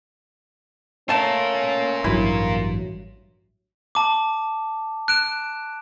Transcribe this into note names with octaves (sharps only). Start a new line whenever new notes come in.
A3 C#4 F4 A#4 A5
A1 G2 F#3 E4
A5 D6
F#6 D7 E7